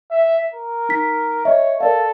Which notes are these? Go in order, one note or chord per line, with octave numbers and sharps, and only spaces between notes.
E5
A#4
D#4 B6
C#5 D#5 E5
A4 A#4 D5 F5